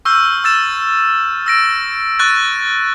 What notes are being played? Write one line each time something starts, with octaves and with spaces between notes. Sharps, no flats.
C#6 E6 F6 G6
E6 A6 E7
E6 A#6 D7
C#6 F#6 A6